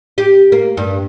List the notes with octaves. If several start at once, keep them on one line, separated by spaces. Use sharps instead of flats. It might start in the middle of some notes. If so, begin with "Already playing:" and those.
G4
A#3
G2